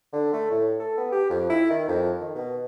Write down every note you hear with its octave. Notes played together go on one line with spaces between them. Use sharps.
D3
A3
A2
A4
B3
G4
F2
E4
D#3
F2
D#3
B2